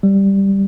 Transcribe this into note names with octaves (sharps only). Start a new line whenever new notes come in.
G3